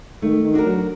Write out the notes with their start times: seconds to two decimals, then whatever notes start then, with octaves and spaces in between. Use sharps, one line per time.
0.22 D#3 A3
0.43 D#3
0.54 D4 F#4 A#4
0.64 F#3